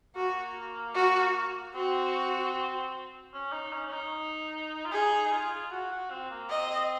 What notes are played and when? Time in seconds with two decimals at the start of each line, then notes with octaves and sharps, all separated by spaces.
0.15 A#3 F#4
0.95 F#4
1.75 C4 F#4
3.34 C#4
3.53 D#4
3.73 C#4
3.87 C#4
3.93 D#4
4.85 F4
4.91 D#4 G#4
5.25 D#4
5.31 F4
5.71 F#4
5.91 F#4
6.11 C4
6.30 A#3
6.50 C4 D#5